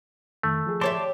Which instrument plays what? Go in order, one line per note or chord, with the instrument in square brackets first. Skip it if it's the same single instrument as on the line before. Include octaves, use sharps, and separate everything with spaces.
[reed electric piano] F2 D#3 [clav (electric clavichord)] A3
[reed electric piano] F3 G#4
[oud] G4 C#5 E5 [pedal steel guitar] D5 A5 C6